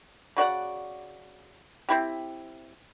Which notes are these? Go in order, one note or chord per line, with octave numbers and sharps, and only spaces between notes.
C#3 F#4 D5 F#5
C4 E4 G4